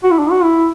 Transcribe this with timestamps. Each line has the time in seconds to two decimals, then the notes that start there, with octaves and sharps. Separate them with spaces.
0.04 F#4
0.11 E4
0.19 D4
0.31 F#4
0.43 E4